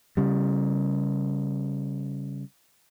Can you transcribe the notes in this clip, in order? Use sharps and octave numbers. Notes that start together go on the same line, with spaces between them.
C#3 G3